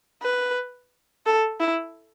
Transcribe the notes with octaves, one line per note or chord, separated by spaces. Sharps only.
B4
A4
E4